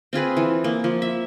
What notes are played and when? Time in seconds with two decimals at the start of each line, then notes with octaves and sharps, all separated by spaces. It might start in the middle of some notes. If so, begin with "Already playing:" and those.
0.13 C4 F4 G#4 B4
0.37 E3
0.64 A#3
0.84 F3
1.02 E5